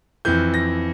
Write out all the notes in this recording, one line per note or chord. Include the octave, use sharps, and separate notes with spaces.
F2 E3 G6
A#6